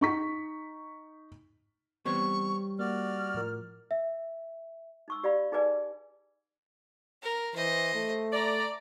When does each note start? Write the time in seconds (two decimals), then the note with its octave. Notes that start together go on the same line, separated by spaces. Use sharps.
0.01 D#4 C#6 B6
2.06 E3 G3 B3 C4 C5 C#5 C#6
2.79 A#3 F#4 D5 F6
3.34 A2 F3 A#4
3.91 E5
5.08 D#4 C#6 E6
5.24 G4 D5 F5 B5
5.52 D#4 G#4 B4 D5 G#5
7.22 A#4
7.56 E3 C5 D#5
7.95 A3
8.32 D5 A#5